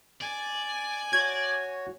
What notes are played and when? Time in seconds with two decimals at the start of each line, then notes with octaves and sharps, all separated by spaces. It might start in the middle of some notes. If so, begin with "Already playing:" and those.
0.21 D5 G#5
1.13 F#4 C#5 G#6